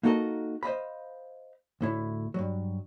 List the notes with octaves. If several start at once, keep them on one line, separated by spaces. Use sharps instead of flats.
A#3 D#4 F#4 A4 A#4 D#5
C5 D#5 F5 B5
D2 A2 E4
G2 F#3